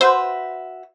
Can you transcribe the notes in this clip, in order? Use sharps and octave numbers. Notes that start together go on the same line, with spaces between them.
F#4 B4 C5 E5